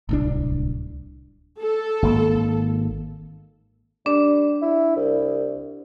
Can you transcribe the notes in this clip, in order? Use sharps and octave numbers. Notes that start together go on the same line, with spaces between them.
D1 C2 D4
A4
G#1 A#3
G3 D4
E4
C2